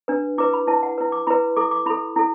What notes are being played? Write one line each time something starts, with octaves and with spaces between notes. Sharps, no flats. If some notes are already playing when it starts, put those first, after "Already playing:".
D4 B4
E4 B4 D6
B5
E4 B4 A5
F#5
E4 B4
D6
E4 B4 B5
E4 A4 D6
D6
E4 A4 B5
E4 A4